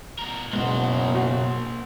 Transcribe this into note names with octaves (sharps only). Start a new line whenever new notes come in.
B2 A#4
F#1 B2 G#3 A#3 B3 C5
F#4